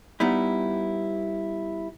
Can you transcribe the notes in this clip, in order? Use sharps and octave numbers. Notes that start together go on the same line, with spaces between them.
G3 B3 D#4 E4